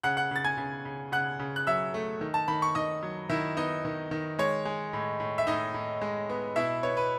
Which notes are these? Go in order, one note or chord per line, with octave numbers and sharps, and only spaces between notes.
C#3 F#5 F#6
F#5 F#6
C#3 A6
G#5 G#6
C#3
C#3
C#3 F#5 F#6
C#3
F#6
F#3 E5 E6
A3
D#3
A5
D#3 B5
C#6
D#3 D#5 D#6
F#3
D#3 E4 E5
B3 D#4 D#5
D#3
D#3
G#3 C#5
G#3
A2
A2
E5
A2 D#4 D#5
A2
G#3
B3
B2 E4 E5
B3 C#5
B4